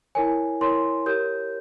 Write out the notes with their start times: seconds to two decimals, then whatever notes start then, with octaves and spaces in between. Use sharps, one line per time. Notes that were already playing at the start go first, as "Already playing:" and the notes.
0.15 E4 A#4 C#5 G#5
0.61 E4 A#4 C#5 C6
1.06 G4 A#4 C#5 G6